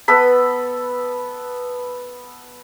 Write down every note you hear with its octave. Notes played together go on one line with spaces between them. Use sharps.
B3 A4 B4 B5